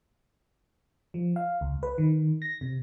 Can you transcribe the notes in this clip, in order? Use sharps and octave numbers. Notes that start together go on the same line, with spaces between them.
F3
F5
C#2
B4
D#3
A#6
C3